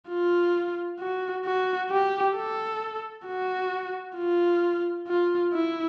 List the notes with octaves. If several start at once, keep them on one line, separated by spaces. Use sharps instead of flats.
F4
F#4
F#4
G4
A4
F#4
F4
F4
E4